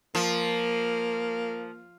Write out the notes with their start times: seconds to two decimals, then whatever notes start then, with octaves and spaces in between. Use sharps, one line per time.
0.15 F3 A#3